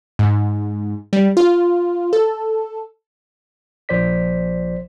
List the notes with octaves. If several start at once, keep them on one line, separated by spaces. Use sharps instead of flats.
G#2
G3
F4
A4
A#1 F3 C5 D5 B6